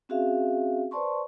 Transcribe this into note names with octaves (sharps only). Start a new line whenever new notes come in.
C4 C#4 F#4 G#4 E5 F5
B4 C5 D5 A5 C6 C#6